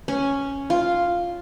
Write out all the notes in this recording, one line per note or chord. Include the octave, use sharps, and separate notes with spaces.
C#4
F4